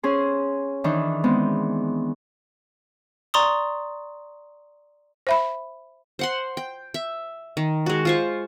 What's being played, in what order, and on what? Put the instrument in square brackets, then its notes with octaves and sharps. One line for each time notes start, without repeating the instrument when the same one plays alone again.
[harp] C#4 G#4 C5
D#3 E3 D4 D#4
G#3 B3 C4
[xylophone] D5 A#5 C6 C#6 D#6
[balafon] C5 E5 B5
[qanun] C5 F#5 C6
G5
E5
D#3
G#3 F#4
F4 C5 C#6